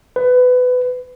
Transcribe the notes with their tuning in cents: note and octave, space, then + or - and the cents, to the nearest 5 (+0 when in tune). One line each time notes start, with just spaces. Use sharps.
B4 +20